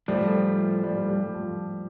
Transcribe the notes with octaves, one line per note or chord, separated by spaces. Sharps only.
A2 F3 G3 A3
G3
G3
F3